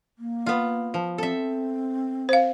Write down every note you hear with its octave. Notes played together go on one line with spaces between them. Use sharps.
A#3
B3 F4
F3
C4 A4 E5
C5 F5